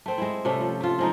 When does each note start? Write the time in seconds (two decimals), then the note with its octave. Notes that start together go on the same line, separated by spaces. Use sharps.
0.06 A3 C4
0.18 G#3 E4
0.45 C3 G3 A3 C#4
0.61 F3
0.80 A3 F4
0.98 F3 G#3 D#4